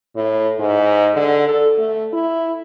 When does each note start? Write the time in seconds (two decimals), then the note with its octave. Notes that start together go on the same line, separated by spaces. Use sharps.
0.16 A2
0.59 G#2
1.16 D3
1.48 A4
1.78 A3
2.13 E4